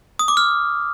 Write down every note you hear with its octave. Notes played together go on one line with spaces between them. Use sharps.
D#6
D6
F6